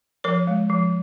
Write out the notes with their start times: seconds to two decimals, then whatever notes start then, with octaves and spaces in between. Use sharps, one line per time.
0.24 F3 A#4 C#5
0.47 G#3
0.69 F3